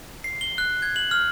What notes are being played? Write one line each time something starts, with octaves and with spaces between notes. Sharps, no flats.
C7
G7
F#6
G#6
F#7
F6